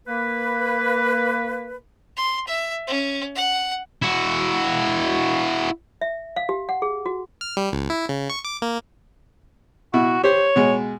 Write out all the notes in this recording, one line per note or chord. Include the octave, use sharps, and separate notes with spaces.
A#3 B4
C6
E5
C#4
F#5
E4 F#4
E5
F5
G4
F#5
G#4
F#4
F6
G3
C#2
E4
C#3
C#6
D6
A#3
B2 E4 F#4
G4 C5 C#5
B2 G#3